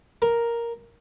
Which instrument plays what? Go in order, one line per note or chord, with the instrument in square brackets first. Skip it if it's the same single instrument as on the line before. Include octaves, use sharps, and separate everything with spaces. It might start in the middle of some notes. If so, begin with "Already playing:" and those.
[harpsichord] A#4